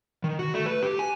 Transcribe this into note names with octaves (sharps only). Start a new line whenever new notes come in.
D#3
F#4
A3
B4
G4
G#5